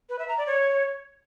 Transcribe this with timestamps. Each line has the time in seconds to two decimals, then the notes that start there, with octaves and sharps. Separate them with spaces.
0.09 B4
0.19 E5
0.28 A#5
0.38 D5
0.47 C#5